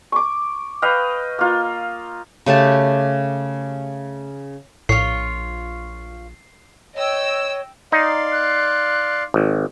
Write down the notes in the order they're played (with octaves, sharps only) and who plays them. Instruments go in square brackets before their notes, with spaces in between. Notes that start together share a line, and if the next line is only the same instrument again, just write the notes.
[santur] C#6 D6
B4 D#5 F5 G5
A#3 F4
[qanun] C#3 A3 G4 A5
[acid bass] A#1 [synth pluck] A2 [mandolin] F4 C#5 [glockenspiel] C7
[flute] C#5 [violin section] D#5 G5 E6
[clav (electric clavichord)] D#4 [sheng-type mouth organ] D5 F5 C6
[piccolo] F#6
[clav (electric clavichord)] G#1